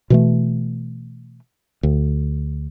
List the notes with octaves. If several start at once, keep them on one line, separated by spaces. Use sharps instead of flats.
B2 E3 A3
D2